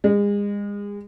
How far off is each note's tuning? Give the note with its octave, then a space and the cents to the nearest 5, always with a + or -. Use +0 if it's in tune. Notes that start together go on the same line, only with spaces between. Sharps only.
G#3 -35